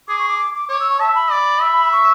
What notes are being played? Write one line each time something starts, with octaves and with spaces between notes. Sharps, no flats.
G#4 D6
C#6
D6
D6
D6
C#5 D6
E6
C#6
E5 A5
B5
D5
E5
C#6